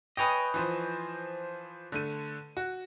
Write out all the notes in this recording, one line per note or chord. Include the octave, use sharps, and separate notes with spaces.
B4 C#5 D#5 G5 G#5 D#6
E3 F3 C5
D3 A3 D#7
F#4